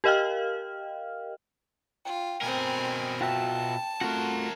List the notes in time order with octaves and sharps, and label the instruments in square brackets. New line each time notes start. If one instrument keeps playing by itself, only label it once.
[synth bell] G4 A#4 D#5 F5 G5 F6
[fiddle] F4 [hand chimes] G5
[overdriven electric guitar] B2 A#4 [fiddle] C4 G#5
[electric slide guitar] F4 F#4 E5 [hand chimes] G5 [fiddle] A5
[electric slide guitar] A3 F4 F#4 [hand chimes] C4 [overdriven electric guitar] A#4 F#5